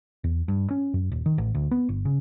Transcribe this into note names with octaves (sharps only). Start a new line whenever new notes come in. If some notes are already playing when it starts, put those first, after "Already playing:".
E2
G2
C#4
F#2
D#1
D#3
A1
D2
B3
G1
C#3